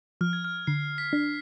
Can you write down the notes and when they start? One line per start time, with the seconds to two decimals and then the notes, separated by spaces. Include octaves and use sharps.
0.21 F3 F6
0.33 G#6
0.45 F6
0.67 D3 C7
0.98 B6
1.13 D4